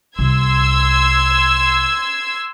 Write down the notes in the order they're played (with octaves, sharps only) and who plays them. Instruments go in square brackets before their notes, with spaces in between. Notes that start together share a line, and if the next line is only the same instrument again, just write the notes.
[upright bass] C2 [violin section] C6 E6 G#6